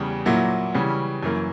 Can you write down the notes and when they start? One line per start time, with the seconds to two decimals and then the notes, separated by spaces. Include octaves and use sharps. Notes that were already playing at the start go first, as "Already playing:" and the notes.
Already playing: E2 C#3 G3
0.26 A#2 F#3 A#3 E4
0.74 C#3 E3 G3 C#4
1.23 F#2 E3 A#3